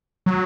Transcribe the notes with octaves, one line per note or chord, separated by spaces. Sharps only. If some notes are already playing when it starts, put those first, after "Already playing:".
F#3